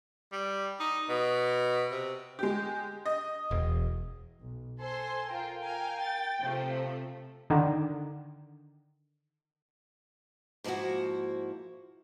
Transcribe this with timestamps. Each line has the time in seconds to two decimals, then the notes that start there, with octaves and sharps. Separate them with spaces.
0.33 G3
0.80 D#4
1.09 B2
1.91 C3
2.39 G#3 G4
3.06 D#5
3.51 E1
4.39 B1
4.80 A4 C5 G#5 C6
5.28 F4 A#4 G5
5.61 A#4 F5 G#5
6.03 A6
6.41 C3 F3 A3
7.50 D3 D#3
10.64 G#2 F3 A#3 E4 F#4